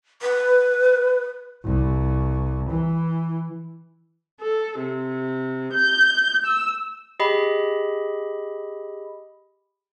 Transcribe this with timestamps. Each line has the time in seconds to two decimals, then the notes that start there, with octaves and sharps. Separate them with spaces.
0.22 B4
1.64 C2
2.69 E3
4.40 A4
4.79 C3
5.74 G6
6.46 E6
7.20 G4 G#4 D#5 B5